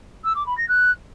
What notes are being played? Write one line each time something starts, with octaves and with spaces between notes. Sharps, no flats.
E6
D6
B5
A#6
F#6